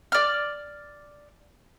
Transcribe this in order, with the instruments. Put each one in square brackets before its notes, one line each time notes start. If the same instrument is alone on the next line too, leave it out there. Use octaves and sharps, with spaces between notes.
[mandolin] D5 F6